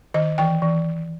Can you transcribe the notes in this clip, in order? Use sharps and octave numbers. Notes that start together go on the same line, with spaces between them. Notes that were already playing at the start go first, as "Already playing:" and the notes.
D#3 D#5
E3 G5
E3